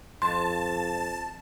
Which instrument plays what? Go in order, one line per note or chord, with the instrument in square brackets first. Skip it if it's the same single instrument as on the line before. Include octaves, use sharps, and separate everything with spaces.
[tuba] F2 [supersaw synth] A5 [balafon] C6